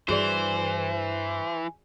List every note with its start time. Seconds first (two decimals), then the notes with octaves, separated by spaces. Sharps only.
0.09 G2 E3 F#4 G#4 C5 D5